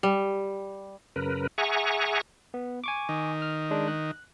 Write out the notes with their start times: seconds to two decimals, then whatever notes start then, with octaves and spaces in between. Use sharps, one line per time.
0.03 G3
1.16 F#2 C#3 A#4 B4
1.58 G#4 E5 F#5 G#5 A#5 C#6
2.54 B3
2.84 G#5 C#6 D6
3.09 D#3
3.42 F6
3.71 G#3 D4
3.88 F#6